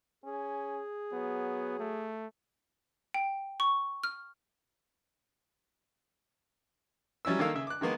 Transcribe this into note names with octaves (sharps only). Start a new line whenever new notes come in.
C#4 G#4
F#3 B3
A3
G5
C#6
F6
F#3 G3 C#4 E4 E6
D#3 A#3 A4 F5 E6
C#3 E5
D6 F#6
D#3 G#3 A#3 B3